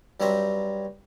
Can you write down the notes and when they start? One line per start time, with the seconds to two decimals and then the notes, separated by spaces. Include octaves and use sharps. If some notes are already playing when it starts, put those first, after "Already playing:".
0.20 G2 F#3 G3 C4 E5 A#5